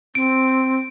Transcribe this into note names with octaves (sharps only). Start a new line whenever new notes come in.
C4 D7